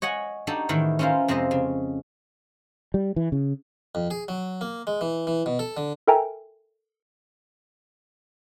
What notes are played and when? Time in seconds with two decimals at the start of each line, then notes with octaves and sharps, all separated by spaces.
0.02 C#5 D#5 F#5 G#5
0.47 D4 D#4 F#4 G4 A4
0.69 A2 D#3 E3 E4
0.99 C#4 E4 F4 A#4 C5
1.28 F2 C3 G#3 C5 D#5
1.51 C#3
2.94 G3
3.16 E3
3.32 C#3
3.95 F2
4.11 G#4
4.28 F#3
4.61 A#3
4.87 G#3
5.01 E3
5.27 E3
5.46 B2
5.59 A4
5.77 D3
6.07 A4 A#4 E5 G5 G#5 A#5